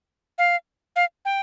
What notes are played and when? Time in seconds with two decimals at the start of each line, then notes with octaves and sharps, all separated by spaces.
0.38 F5
0.96 F5
1.25 G5